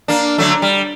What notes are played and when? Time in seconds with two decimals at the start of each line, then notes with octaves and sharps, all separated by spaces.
0.08 A#3 D4
0.38 D3 F#3 A3
0.62 G3